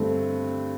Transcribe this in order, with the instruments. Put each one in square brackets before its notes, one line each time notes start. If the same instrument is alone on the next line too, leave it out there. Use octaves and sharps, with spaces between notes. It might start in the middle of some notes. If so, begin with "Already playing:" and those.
Already playing: [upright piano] G2 D3 A3 C4